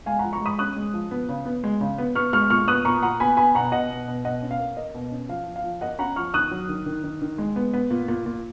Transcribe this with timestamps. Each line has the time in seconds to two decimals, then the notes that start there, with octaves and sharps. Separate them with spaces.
0.06 G#3 F5 G#5
0.19 F#5 A#5
0.24 F3
0.33 A#5 C#6
0.41 G#3 B5 D#6
0.59 C#4 D#6 F#6
0.76 G#3
0.94 F3
1.11 B3
1.29 C#3
1.45 B3
1.64 G#3
1.81 C#3
1.98 B3
2.15 B3 C#6 F6
2.33 G#3 C#6 F6
2.50 A#2 C#6 F6
2.68 B3 D#6 F#6
2.85 A#2 A#5 C#6
3.02 A#2 F#5 A#5
3.20 B3 G#5 B5
3.37 B3 G#5 B5
3.55 B2 F#5 A#5
3.72 B2 D#5 F#5
3.90 B2
4.08 B2
4.25 B2 D#5 F#5
4.42 C#4
4.51 F5
4.59 A#3
4.77 A#3 D#5
4.94 B2
5.11 C#4
5.29 F3 F5
5.46 F3
5.56 F5
5.64 F3
5.81 A#3 D#5 F#5
5.98 C#4 F#5 A#5
6.16 F3 C#6 F6
6.34 D#3 D#6 F#6
6.51 F#3
6.69 D#3
6.86 D#3
7.04 D#3
7.22 D#3
7.38 G#3
7.56 B3
7.73 B3
7.90 A#2
8.08 A#2
8.26 A#2